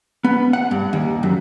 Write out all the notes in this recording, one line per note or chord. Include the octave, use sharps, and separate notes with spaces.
B3
F#5
G2
D#2
F#2